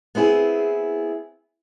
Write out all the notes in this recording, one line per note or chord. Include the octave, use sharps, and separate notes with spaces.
B3 C4 E4 G#4